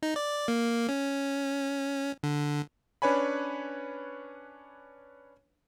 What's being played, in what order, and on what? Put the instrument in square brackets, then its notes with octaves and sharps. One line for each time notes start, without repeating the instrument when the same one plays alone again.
[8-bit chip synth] D#4
D5
A#3
C#4
D3
[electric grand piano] C#4 D4 B4 C#5 G#5 B5